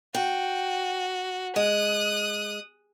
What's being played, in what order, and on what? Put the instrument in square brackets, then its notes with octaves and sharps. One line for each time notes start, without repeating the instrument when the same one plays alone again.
[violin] F#4 [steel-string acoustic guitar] G5
[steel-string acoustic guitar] G#3 [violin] D#6 F#6